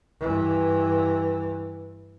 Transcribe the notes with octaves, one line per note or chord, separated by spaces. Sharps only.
G2 E3